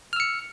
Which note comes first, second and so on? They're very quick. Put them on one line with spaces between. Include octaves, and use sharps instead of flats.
F6 E6 C#7